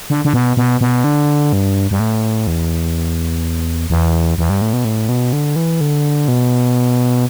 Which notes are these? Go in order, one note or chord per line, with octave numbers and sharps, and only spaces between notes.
D3
D3
B2
B2
B2
D3
G2
G2
A2
E2
E2
E2
G2
A2
B2
A2
B2
D3
E3
D3
B2